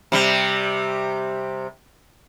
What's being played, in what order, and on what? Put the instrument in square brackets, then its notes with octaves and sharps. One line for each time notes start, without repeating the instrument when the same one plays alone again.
[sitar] C3 G3